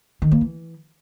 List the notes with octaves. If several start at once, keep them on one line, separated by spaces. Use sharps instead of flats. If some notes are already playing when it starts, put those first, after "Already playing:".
D#3
A#3
E3